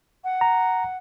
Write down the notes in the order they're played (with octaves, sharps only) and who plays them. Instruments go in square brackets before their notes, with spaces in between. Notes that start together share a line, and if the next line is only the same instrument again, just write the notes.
[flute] F#5
[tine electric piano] A#5